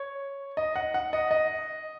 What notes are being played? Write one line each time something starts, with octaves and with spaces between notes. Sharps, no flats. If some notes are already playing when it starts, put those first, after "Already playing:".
Already playing: C#5
D#5
F#5
F#5
D#5
D#5